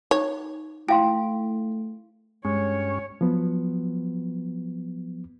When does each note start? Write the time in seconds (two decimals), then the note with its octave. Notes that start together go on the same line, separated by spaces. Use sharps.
0.11 D#4 C#5
0.89 A3 E4 F5 G5 C6
2.45 G2 G#3 C#4 C#5
3.21 F3 F#3 B3